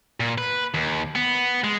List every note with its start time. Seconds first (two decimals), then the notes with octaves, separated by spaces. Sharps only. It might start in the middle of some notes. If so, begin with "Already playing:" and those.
0.20 A#2
0.38 B4
0.74 D#2
1.15 B3
1.64 G#3